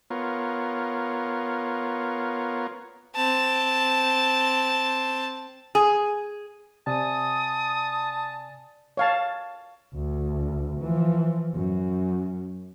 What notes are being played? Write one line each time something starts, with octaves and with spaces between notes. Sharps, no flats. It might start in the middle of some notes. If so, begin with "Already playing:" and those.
B3 F4 A#4 C#5
C4 A5
G#4
C3 D5 G#5 A5 D#6
C#5 F5 A5
D2
E3 F3
F#2